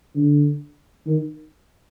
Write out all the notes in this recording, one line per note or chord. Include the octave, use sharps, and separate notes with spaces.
D3
D#3